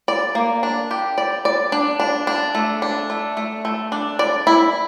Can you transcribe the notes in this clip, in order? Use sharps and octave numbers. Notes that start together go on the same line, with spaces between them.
D5
A#3
D4
G4
D5
D5
D4
D4
D4
A3
D4
A3
A3
A3
D4
D5
E4